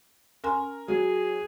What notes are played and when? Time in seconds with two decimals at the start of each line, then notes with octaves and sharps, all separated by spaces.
0.44 C#4 A#4 G#5 C6
0.88 F#3 G#4